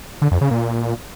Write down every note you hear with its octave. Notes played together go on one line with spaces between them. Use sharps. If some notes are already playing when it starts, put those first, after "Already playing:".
D3
F2
C#3
A#2